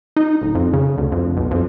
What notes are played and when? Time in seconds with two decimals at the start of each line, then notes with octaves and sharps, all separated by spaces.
0.17 D#4
0.42 D1
0.55 F2
0.73 C#3
0.98 D2
1.12 F2
1.37 B1
1.51 F2